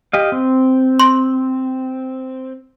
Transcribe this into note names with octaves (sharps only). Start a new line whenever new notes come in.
G4 D#5 F5
C4
C6